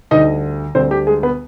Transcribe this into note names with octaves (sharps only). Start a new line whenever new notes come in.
D2 D3 G3 D#4 D#5
D2 D3 G3 C4 C5
G4
G#3 G#4
B3 B4